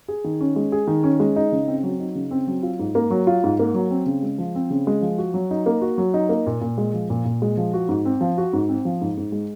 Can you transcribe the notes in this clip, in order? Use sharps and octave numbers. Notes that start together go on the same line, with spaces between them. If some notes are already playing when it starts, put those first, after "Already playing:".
G#4
D#3
C#4
G#3
G#4
D#3
C#4
G#3
D#4
C#3
C4
F#3
D#4
C#3
C4
F#3
F4
G#2
A#3
F#3
F4
G#2
A#3
F#3
C4
C#3
G#3
F3
C4
C#3
G#3
F3
F#4
F#3
D#4
A#3
F#4
F#3
D#4
A#3
A#2
A#2
G#3
F3
A#2
A#2
G#3
F3
F#4
G#2
C4
F3
F#4
G#2
C4
F3
G#2
G#2
G#3